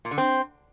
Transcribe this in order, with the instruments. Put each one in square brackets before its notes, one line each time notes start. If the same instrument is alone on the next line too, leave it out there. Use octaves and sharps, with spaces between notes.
[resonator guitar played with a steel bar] A#2
D3
C4